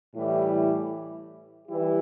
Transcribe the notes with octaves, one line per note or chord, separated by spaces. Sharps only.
A2 E3 G3 E4
E3 G3 E4 G4